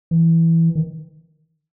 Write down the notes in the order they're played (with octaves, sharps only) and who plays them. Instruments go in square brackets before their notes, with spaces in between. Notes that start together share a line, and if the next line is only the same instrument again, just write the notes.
[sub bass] E3
D#3